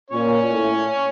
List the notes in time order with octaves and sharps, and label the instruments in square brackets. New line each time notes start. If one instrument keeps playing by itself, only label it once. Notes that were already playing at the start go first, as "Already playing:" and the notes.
[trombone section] A#2 [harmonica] C#4 C#5
[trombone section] A2